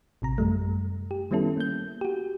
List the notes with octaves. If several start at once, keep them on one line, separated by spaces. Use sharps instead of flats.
A1 C3 A#5
F#2 G3 A3
G4
D#3 G3 B3 C#4 E4 A4
A#3 G6
F#4 G4